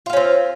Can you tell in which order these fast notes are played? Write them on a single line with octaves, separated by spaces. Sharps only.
F4 F5 C#4 C4